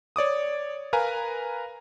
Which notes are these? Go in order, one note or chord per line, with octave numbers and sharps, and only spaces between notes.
C#5 D5 D6 D#6
A#4 B4 F5 G#5 A#5